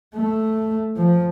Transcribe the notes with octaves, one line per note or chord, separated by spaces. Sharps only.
A3
F3